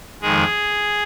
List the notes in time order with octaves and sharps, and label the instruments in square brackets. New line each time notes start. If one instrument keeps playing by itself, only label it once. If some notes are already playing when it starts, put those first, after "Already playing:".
[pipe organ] F2 D#3 G#3 G#4